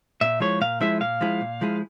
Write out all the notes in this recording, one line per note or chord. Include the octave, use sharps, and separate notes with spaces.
A#2 E5
F3 G#3 E4 G#4 C#5
A#2 F5
F3 G#3 E4 G#4 E5
A#2 F5
F3 G#3 E4 G#4
A#2
F3 G#3 E4 G#4